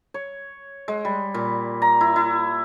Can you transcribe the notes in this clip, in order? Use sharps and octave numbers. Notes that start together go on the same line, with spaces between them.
C#5
G#3
G3
A#2
A#5
E4
E4